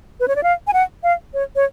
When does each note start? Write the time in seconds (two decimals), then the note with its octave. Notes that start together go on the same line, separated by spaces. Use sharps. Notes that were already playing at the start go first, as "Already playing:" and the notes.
0.20 B4
0.28 C#5
0.36 D5
0.43 F5
0.67 G#5
0.73 F#5
1.03 F5
1.34 C#5
1.56 C#5